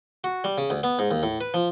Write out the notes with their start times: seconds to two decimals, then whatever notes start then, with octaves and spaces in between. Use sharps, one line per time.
0.24 F#4
0.44 G3
0.58 C#3
0.70 D2
0.83 B3
0.99 G#2
1.11 D#2
1.23 A2
1.41 B4
1.54 F3